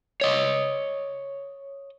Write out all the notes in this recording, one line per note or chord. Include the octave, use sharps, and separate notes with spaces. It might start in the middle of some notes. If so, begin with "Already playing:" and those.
C#5 D#5